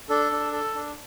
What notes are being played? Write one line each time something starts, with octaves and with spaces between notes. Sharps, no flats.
D4 A4
D4
A4
D4